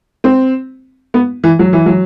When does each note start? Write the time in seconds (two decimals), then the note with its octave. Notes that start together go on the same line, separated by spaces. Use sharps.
0.24 C4
1.14 B3
1.44 E3
1.59 F#3
1.73 E3
1.86 F#3